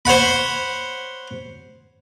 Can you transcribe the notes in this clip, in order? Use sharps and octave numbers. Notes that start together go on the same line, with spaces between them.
C5 C#5 F#5 B5